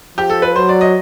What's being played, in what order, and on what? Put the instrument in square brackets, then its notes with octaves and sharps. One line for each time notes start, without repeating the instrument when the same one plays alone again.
[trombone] F3 [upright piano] G4
[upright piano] A4
B4
[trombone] F#3 [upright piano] C5
[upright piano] D5
D#5